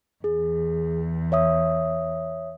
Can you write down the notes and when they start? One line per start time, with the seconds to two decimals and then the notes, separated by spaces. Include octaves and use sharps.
0.24 E2 G#4
1.32 C#5 E5 D#6